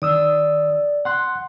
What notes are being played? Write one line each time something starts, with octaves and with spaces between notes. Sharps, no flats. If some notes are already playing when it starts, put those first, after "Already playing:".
D#3 D5 D#6 E6
F#5 C6 F#6